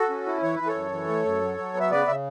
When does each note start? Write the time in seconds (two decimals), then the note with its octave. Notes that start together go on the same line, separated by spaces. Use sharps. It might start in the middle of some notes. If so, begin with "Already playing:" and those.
Already playing: F#4 A4
0.10 C#4
0.26 E4
0.42 E3 C#5
0.55 E3 B4
0.67 A4 C#5
0.75 F#2
0.91 E3
1.08 A3
1.25 F#2
1.42 F#3
1.58 F#3
1.74 B3
1.80 E5
1.91 C#3 B4 D5
2.07 C#3 E5